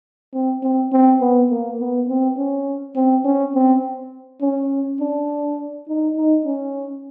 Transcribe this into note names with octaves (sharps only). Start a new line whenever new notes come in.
C4
C4
C4
B3
A#3
B3
C4
C#4
C4
C#4
C4
C#4
D4
D#4
D#4
C#4